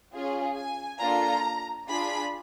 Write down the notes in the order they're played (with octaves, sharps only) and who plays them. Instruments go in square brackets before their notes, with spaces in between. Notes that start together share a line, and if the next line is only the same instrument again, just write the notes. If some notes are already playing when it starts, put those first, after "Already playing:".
[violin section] C#4 F4 G#4
G#5
A#3 D4 F4 A4 A#5
D4 F4 G#4 B5